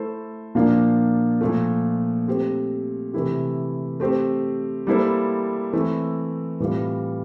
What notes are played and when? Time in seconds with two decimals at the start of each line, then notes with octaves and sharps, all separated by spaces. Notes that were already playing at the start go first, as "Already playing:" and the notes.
Already playing: A3 E4 A4 C5
0.55 A#2 F3 A#3 D4 F4
1.41 A#2 F3 A3
2.27 A3 C4 G4 C5
3.13 C3 E3 A3 E4 G4
4.00 A3 C4 G4 C5
4.87 G3 A#3 E4 A4 C5
5.73 E3 A3 C4 E4
6.60 A2 E3 G3 C4 F4